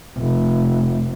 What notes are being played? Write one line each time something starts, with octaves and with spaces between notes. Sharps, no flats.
F1